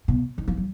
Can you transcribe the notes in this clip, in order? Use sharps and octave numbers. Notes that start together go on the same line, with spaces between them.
B2
D#3
F3
F#3